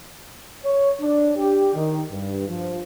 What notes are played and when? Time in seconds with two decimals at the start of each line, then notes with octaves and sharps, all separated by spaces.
0.64 C#5
1.01 D4
1.38 G4
1.74 D#3
2.12 G2
2.49 F3